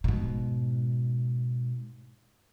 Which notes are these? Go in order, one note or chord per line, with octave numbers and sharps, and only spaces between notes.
G#2 B2